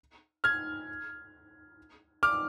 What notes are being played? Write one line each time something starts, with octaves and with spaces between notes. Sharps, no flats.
F6 G#6
D6 F6